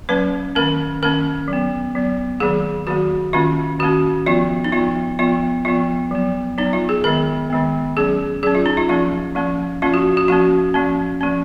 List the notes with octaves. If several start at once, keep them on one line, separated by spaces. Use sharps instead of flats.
F#3 A#3 C#4 B4
D#3 A#3 C#4 A#4
D#3 A#3 C#4 A#4
F#3
B3
F#3 B3
D#3 F#3 A#3 G#4
D#3 F#3 A#3 F#4
D#3 A#3 C#4 F4
D#3 A#3 C#4 F#4
F3 B3 F4
D#4
F3 B3 F4
F3 B3 F4
F3 B3 F4
F#3 B3
F#3 B3 D#4
F4
G#4
D#3 G#3 B3 A#4
D#3 G#3 B3
F#3 C#4 G#4
F#3 C#4 G#4
F4
D#4
F4
F3 A#3 C#4 F4
F3 A#3 C#4
F3 A#3 C#4 F4
F#4
F#4
F3 A#3 C#4 F#4
F3 A#3 C#4
F3 A#3 C#4